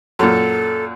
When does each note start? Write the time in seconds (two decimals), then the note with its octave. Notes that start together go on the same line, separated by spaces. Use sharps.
0.19 F#2 A#2 A4